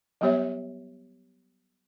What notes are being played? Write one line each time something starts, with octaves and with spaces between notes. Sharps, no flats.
F#3 G3 B3 G4 C#5 E5